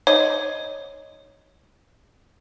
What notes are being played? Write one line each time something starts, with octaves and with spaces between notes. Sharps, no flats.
D#4 C5 C#5 D#5